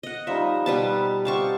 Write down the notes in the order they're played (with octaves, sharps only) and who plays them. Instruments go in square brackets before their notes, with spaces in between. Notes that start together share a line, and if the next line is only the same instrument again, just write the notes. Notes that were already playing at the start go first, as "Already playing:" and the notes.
[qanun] D#5 F#5
[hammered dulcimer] F3 G3 D#4 [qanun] E5
[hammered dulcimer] B2 [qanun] G3 B4 A5
[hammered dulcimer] C4 F#4 G4 [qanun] F5 A5 C#6